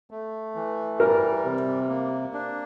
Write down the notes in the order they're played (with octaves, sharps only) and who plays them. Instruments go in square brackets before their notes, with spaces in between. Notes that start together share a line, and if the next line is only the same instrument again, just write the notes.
[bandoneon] A3
E3
[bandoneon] G3 [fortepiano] A#4
[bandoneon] C3
A#3
D4